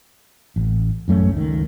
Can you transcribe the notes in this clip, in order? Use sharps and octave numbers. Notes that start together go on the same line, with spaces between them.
A1
A1 F#2 A3 C#4
C#2 D#3